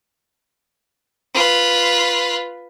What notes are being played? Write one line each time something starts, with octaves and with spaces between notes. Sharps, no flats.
F4 B4